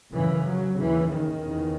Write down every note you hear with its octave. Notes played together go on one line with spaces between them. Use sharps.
F#2 C#3 E3
F#3
D#2 C#3 E3
D#3
E2 C#3